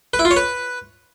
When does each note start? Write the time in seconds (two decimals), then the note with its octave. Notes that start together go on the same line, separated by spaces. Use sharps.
0.14 B4
0.19 E4
0.25 F4
0.31 C#5
0.37 B4